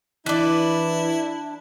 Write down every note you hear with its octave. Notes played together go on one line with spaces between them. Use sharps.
E3 D4 E4 B4 D5